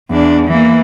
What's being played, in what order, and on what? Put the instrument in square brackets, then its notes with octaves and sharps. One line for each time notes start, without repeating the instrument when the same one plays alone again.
[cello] E2 D4
E3 A#3